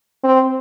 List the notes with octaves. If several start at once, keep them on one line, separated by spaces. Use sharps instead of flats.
C4